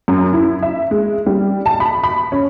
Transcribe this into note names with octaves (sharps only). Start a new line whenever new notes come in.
F#2
E4
E5
G#3
G3
A5
B5
B5
C#4